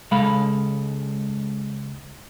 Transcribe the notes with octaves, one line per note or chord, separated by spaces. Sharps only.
C#2 G#3 A4 F5 B5